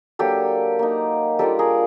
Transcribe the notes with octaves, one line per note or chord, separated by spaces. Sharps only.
F#3 A#3 D4 G4 A4
A#3 D#4
G3 A#3 D4 F4 G4 A4
G#4 A#4